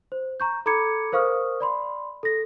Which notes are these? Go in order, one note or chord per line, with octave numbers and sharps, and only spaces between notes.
C5
A#5 C#6 G6
A4 A#5 B5 D6 G#6 C#7
A#4 C5 F5 C#6 D#6 F6
D5 B5 C6
A4 A#6